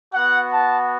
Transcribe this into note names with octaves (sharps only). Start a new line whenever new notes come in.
B3 F#4 F#5
A5